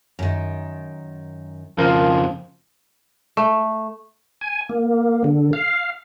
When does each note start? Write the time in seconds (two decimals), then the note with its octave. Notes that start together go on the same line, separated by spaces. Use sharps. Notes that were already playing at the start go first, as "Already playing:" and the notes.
0.19 F#2 D#3
1.78 F2 C#3 F3 A#4
3.37 A3
4.41 G#5
4.69 A#3
5.24 D3
5.53 F5